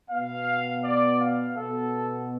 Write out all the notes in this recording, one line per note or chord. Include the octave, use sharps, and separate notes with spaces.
B2 B3 F5
D5
F5
B2 B3 A4